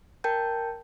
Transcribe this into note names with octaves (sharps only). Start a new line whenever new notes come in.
A#4 G5 A5 G6